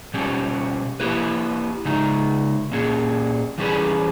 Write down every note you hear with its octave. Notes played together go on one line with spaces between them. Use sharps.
B2 G3 C#4 G4
A#3 E4 G4 B4
C#3 G#3 D#4
A#2 A#3 C#4 G#4
E3 G3 C#4 G#4 B4